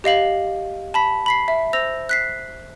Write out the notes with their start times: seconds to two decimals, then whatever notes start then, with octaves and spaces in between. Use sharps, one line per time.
0.04 G4 D#5 F5 F#7
0.94 A5 B5 B6
1.26 B5 B6 C7
1.48 E5
1.73 C5 E6 A#6 F7
2.09 F#6 B6 C7